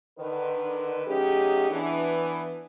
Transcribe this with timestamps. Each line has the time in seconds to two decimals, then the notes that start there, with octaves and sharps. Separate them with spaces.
0.18 D3 D#3 B4
1.06 F#3 A3 C#4 D#4 G4 G#4
1.69 E3 B3 D4